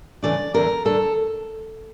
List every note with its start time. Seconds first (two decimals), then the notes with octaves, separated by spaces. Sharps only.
0.23 C#3 E3 A3 D4 D5
0.54 E2 D3 A3 D4 A#4
0.85 D3 A3 D4 A4